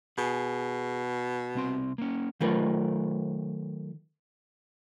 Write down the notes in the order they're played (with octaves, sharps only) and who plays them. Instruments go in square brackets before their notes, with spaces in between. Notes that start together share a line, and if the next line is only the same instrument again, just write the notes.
[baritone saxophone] B2 [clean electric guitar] G#4 G#5
[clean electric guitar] C2 C4 C6
A#3 C#4
[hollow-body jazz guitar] D#3 F#3 A3 F4 A#4 B4